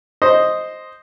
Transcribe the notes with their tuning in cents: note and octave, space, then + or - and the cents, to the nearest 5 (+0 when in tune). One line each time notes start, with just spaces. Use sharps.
C5 +0 D#5 +0